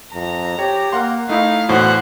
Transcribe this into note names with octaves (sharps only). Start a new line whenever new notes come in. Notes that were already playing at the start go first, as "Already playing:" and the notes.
F2 A#5
G4 C#5
A#3 F5 F#5 C6
A3 D#4 E4 F5
E2 A2 F#3 F#4 C5 F#5